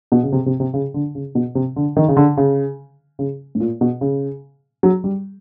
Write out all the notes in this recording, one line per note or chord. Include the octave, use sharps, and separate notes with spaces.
B2
C#3
C3
C3
C3
C#3
D3
C#3
B2
C3
D3
D#3
C#3
D3
C#3
C#3
A2
A#2
B2
C#3
F#3
G3